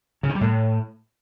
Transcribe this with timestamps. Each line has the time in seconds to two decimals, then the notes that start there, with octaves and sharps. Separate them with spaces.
0.23 C#3
0.29 D#3
0.35 G3
0.41 A2